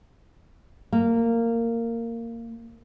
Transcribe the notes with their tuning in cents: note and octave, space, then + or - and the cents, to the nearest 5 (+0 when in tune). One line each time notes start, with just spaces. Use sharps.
A#3 -15